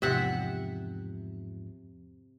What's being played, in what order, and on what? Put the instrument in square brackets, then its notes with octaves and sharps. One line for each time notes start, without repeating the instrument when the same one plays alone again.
[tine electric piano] E2 G#2 F3 [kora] C3 E5 F#5